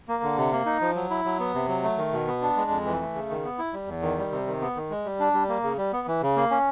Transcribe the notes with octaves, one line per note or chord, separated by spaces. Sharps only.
A#3
D3
C3
A#3
D#4
F3
F#3
E4
F#3
B3
C3
F#3
A3
D#3
B2
B3
D4
G#3
F2
E3
A3
C#3
D#3
B3
E4
G3
E2
D#3
G3
C3
D#3
B3
D#3
G#3
G3
D4
G3
A#3
C#3
G3
B3
E3
C#3
A#3
C#4